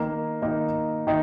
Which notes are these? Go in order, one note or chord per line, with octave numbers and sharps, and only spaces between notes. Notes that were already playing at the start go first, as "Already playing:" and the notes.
Already playing: D#3 A#3 D#4
D#3 A#3 D#4
D#3 D#4